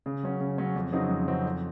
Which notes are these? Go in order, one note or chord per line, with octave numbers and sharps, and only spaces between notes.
C#3
F#3 C#4
C#3
F#3 C#4
F2
C#3 F#3 C4 D#4
F2
C#3 F#3 C4 D#4
F2